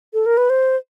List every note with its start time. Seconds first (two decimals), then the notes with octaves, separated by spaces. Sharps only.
0.14 A4
0.26 A#4
0.37 B4
0.50 C5